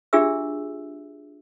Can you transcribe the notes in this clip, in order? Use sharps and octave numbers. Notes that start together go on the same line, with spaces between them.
D4 F4 G4 G#4 E5 E6